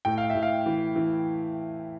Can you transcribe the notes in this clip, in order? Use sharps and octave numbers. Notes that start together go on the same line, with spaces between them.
A2 G5
F5
E5
A2
F5
E3
E3